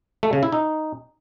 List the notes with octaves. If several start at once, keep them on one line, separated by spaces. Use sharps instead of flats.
A3
C#3
E4
D#4